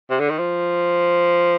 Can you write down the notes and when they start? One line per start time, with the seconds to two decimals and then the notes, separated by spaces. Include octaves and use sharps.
0.10 C3
0.20 D3
0.29 D#3
0.39 F3